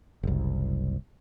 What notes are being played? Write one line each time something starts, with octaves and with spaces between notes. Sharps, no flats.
F#1 C2